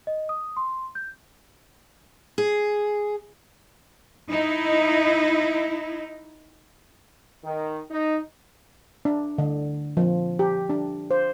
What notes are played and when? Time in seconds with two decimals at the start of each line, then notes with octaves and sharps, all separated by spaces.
0.07 D#5
0.29 D#6
0.57 C6
0.95 G6
2.38 G#4
4.31 D#4 E4
7.44 D#3
7.91 D#4
9.05 D4
9.38 D3
9.97 F3
10.39 G4
10.70 D4
11.11 C5